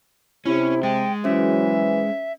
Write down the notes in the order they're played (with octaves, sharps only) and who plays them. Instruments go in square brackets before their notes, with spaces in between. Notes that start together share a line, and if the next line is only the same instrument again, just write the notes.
[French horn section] C3 [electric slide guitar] C#4 [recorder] E4
[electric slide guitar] G#3 [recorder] G5 [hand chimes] A6
[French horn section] E3 F#3 [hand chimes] C#4 G#4 C5 [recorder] E5